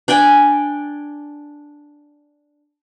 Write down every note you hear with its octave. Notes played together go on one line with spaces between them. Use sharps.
D4 D5 G5 G#5